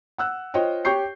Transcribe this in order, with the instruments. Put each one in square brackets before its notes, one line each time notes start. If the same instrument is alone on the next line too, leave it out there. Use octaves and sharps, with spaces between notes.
[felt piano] F#5 E6 F#6
F4 C5 C#5 D#5 G5
G4 C#5 C#6 G6 C7